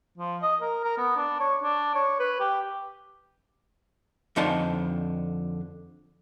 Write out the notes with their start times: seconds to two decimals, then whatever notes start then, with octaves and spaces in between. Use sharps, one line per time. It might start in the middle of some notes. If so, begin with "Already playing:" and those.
0.18 F3
0.42 D#5
0.61 A#4
0.84 A#4
0.98 B3
1.17 D4
1.40 C#5
1.63 D4
1.95 C#5
2.20 B4
2.40 G4
4.36 F2 D3 D#4 C5 A5